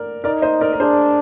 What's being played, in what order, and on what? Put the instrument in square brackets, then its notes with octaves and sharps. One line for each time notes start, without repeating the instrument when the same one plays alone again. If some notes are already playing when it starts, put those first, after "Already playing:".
Already playing: [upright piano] A#4 D5
[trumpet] D#4 [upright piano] A#4 D5
[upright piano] C5 D#5
A#4 D5
A#4
[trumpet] D4 [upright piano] G#4 C5